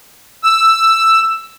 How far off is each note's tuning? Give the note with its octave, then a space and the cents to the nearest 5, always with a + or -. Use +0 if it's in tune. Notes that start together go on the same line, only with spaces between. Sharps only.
E6 +5